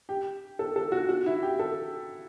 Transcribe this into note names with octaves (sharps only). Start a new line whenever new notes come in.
G4
A4
A4
F#4
F#4
E4
G4
A4